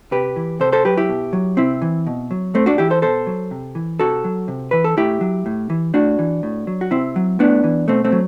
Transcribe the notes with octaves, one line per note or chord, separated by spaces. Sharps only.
C3 G4 B4
E3
C3 A4 C5
A4 C5
F#3 G4 B4
E4 G4
B2
F#3
C3 C4 E4
E3
B2
F#3
A2 A3 C4
D4 F#4
E3 E4 G4
A4 C5
B2 A4 C5
F#3
C3
E3
C3 F#4 A4
F#3
C3
E3 B4
A4
A2 E4 G4
F#3
A2
E3
A2 D4 F#4
E3
A2
F#3
F#4
C3 C4 E4
F#3
A2 B3 D4
E3
B2 A3 C4
A3 C4
F#3